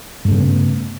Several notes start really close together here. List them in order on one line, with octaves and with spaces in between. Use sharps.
G2 A3 C#3 B3